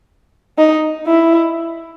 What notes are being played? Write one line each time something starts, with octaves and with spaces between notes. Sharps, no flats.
D#4
E4